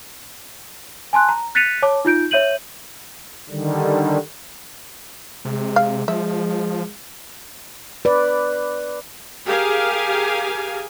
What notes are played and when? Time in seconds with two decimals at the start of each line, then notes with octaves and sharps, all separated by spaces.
1.13 G#5 A5 C6 F#6
1.29 A#5
1.55 F#6 A6 B6 C#7 D#7 F7
1.82 C#5 A5 D6
2.05 D#4 F4 G6 D7
2.31 C#5 E5 G6 D#7 F#7
3.50 D3 D#3 G3
5.45 C3 G#3
5.76 F5
6.08 F3 G#3 E5
8.05 B4 D5
9.47 G4 G#4 A#4 F5 G#5